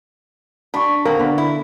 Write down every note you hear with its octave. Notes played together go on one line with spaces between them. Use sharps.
D4 B5 C#6
B2 D#3 A#3 C4 A#4
D3 B3
E4